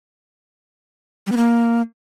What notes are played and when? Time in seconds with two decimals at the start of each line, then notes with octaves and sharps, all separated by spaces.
1.27 G3
1.32 B3
1.37 A#3